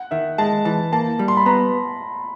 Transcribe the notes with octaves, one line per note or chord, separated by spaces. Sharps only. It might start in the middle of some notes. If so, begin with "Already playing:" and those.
Already playing: F#5
D#3 E5
G#3 A5
E3 A5
A#3 A5
G3
C6
B5
B3 A#5